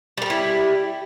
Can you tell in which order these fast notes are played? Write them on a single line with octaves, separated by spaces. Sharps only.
G3 A#4 G4 E4